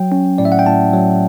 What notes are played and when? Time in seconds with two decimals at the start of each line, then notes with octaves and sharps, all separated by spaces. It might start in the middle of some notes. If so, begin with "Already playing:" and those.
Already playing: F#3 G5
0.12 C#4
0.38 A2 D5
0.45 E5
0.52 F#5
0.59 G5
0.66 A2 A5
0.93 F#3